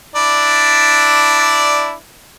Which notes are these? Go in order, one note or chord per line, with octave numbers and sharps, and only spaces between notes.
D4 E4 D5